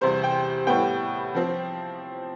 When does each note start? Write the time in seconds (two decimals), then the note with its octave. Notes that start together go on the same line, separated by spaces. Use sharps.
0.01 E2 C3 G3 C5
0.23 G5
0.67 A2 G3 B3 G5
1.35 F3 C4